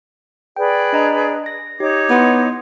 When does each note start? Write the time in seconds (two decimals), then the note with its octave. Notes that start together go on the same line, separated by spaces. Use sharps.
0.56 G#4 B4 D5 G5
0.93 D4 D#5 A#5
1.46 A#6
1.80 D#4 G4 C#5 D6
2.10 B3 E4 C6